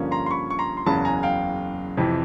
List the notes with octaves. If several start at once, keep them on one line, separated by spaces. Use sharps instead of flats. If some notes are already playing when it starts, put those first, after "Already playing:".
Already playing: G2 D3 F3 A#3 C#4
A#5 C6
C6
B5 C#6
C#6
A#5 C6
C6
F#1 E2 C#3 F#3 A5 B5
G#5 A#5
F5 G5
F2 C3 E3